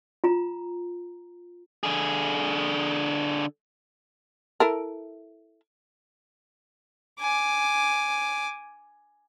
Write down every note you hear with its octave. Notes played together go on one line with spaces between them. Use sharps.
F4 A#5
D3 G#4
E4 A4 A#4
G#5 D6